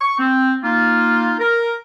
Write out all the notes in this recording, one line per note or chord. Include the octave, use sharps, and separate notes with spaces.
C#6
C4
A#3 D#4 F4
A#4